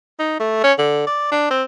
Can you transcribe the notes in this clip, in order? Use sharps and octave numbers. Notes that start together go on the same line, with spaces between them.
D#4
A3
C#4
D3
D5
D4
C4